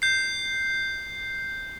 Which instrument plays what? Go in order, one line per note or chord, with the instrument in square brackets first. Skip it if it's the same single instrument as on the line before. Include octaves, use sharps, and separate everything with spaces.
[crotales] G6 C7